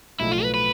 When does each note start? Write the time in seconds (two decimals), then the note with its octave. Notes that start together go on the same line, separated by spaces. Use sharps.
0.20 B1 A2 F3 A3 E4
0.32 F4
0.43 B4
0.54 B4